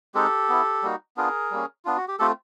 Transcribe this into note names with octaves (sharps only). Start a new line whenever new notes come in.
G#3 C4 D#4 G4 A4
B3 E4
G3 A#3 D#4 F#4
B3 D4 F4 G#4 A#4
G3 A#3 C#4
B3 D4 F4
F#4
G4
A3 C4 F4 G4 A4